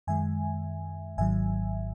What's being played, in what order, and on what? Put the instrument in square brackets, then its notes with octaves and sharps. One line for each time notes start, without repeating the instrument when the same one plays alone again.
[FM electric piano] F#2 D#3 G#3 E5 G#5
G#1 G#2 D#3 F#3 E5 G#5